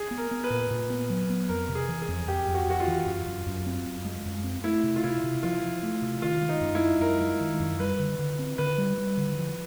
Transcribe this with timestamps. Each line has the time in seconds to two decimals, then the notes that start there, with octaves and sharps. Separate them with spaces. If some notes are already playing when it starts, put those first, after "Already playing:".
Already playing: G#4
0.11 B3
0.18 A#4
0.31 B3
0.44 B4
0.50 A#2
0.71 A#2
0.90 B3
1.10 F#3
1.30 B3
1.49 F2 A#4
1.69 C3
1.75 G#4
1.89 E3
2.02 G#4
2.09 F2
2.27 F2 G4
2.48 F2
2.54 F#4
2.67 F2 F#4
2.80 F4
2.87 E3
3.06 F#2
3.26 F#2
3.46 F#2
3.66 C4
3.86 F#2
4.05 G#3
4.25 F#2
4.44 C4
4.64 A3 E4
4.83 C3
4.96 F4
5.04 C3 E4
5.24 C3
5.43 F3 F4
5.63 F3
5.83 A3
6.02 C3
6.22 D#3 F4
6.42 G#3
6.49 D#4
6.61 F#2
6.75 E4
6.81 G#3
7.00 F#2 A#4
7.21 G#3
7.40 D#3
7.60 F#2
7.80 G3 B4
7.99 D3
8.19 D3
8.39 C4
8.58 D3 B4
8.78 G3
8.98 G3
9.17 D3
9.37 F3